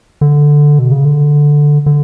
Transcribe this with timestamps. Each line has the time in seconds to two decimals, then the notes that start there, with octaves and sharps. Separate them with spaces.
0.21 D3
0.79 B2
0.92 C#3
1.04 D3
1.86 D3